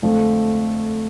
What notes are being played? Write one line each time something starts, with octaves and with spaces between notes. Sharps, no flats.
F2 D3 F3 A3